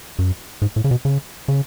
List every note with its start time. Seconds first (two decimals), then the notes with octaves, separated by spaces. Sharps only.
0.19 F#2
0.62 G#2
0.76 A2
0.84 C#3
0.91 B2
1.05 C#3
1.48 C#3